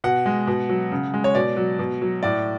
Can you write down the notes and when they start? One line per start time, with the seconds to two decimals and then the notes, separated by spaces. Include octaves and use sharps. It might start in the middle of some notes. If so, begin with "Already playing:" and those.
0.04 B2 F#5
0.26 G#3
0.47 B2
0.69 F#3
0.92 C#3
1.14 G#3
1.24 C#5
1.35 B2 D5
1.57 F#3
1.79 B2
2.02 F#3
2.23 A2 D5